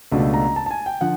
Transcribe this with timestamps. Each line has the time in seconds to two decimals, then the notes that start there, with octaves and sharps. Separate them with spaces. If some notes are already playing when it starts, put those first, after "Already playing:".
0.12 C#2 B2 F#3 A3 D4
0.34 A#5
0.56 A5
0.66 A5
0.71 G#5
0.86 G5
1.01 D3 F3 F#5